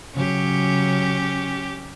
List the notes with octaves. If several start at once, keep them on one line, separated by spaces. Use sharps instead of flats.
C#3 F#3 C#4 G4